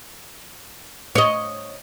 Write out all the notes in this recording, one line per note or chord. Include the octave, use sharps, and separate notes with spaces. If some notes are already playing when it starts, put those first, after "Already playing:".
C#5 D#5